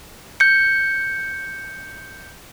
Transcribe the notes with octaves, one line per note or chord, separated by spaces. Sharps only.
G6 C#7